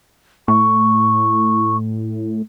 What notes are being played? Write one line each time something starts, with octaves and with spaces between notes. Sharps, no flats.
A2 C#6